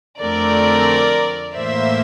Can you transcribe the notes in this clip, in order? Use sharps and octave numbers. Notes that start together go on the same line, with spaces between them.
F2 D3 A3 C4 A#4 D5
A2 E3 A#3 C5 E5